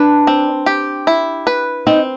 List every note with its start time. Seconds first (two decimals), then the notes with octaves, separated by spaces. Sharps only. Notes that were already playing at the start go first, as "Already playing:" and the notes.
Already playing: D4 B4
0.27 C4
0.66 G4
1.07 E4
1.47 B4
1.87 C4 D#4